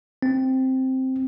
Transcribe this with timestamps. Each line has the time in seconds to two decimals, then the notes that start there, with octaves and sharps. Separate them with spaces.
0.22 C4